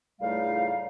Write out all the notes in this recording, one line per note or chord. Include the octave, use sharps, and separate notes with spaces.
C#2 A2 G3 A3 D#4 F5